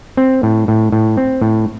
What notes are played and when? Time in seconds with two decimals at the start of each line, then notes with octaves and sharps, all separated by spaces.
0.17 C4
0.43 A2
0.68 A2
0.92 A2
1.17 C4
1.41 A2